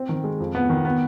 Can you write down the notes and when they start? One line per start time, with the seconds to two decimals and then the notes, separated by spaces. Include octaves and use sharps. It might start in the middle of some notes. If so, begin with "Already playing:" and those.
Already playing: C4
0.09 D#3
0.24 G#3
0.40 F2
0.55 B3
0.70 D#3
0.85 B3